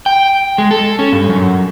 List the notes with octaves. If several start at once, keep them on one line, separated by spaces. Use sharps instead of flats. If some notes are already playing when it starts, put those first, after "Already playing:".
G5
G#3
A4
C#4
G2
F#2